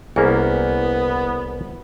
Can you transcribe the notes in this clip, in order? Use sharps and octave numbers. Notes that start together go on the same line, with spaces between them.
C2 A#3 B3 C#4 E4 G#4 G#5